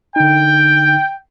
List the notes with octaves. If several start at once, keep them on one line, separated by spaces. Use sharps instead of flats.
D3 D#4 G5